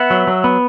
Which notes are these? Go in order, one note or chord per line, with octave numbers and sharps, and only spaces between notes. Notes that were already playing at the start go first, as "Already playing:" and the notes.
Already playing: B3 E5 F#5
F#3
F#3
B3